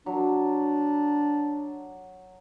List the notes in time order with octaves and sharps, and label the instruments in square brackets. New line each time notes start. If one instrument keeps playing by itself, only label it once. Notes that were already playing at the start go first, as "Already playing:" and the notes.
[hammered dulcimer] F#3 [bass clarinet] D4